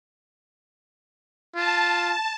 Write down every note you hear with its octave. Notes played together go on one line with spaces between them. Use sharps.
F4 A5